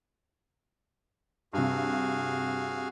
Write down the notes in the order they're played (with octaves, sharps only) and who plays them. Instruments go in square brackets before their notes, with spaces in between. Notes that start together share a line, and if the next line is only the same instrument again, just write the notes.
[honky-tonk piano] G2 C3 [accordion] F#4 G#4 F5